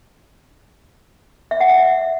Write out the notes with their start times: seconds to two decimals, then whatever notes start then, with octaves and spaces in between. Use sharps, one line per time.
1.51 E5
1.60 F#5
1.70 E5